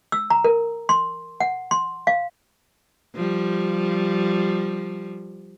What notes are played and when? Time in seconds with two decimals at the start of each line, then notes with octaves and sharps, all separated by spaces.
0.12 E6
0.30 A#5
0.44 A#4
0.89 C6
1.40 F#5
1.71 C6
2.07 F5
3.15 F3 G3